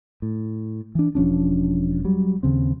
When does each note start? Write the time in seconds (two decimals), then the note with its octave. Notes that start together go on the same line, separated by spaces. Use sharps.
0.22 A2
0.95 E3 D4
1.15 E1 F3 C#4 D4
2.05 F#3 G3
2.43 D#2 C#3 C4